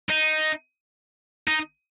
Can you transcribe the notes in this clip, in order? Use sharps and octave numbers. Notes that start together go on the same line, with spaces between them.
D#4
D#4